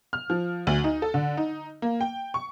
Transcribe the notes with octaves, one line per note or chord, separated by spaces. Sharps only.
F6
F3
D2
D#4
A4
D3
D#4
A#3
G5
C#6